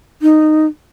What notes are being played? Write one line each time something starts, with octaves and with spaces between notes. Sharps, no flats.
D#4